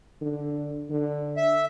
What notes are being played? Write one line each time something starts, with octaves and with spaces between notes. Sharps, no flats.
D3
D3
E5